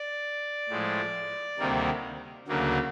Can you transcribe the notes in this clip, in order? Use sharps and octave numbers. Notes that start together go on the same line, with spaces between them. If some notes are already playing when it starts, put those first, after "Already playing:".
Already playing: D5
A2 F3 G#3
D2 C3 D#3 G3 A#3
D2 C#3 F#3 A#3